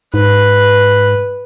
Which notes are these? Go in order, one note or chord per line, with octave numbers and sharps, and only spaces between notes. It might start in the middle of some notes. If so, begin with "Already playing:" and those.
G#2 B4